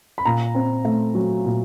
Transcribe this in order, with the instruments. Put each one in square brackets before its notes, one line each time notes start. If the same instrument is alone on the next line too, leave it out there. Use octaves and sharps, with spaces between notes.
[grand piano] B5
A#2 A#5
C4
A3
F#3
A#2